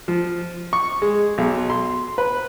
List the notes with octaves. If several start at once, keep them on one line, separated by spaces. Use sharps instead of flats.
F3
C#6
G#3
B1
C6
B4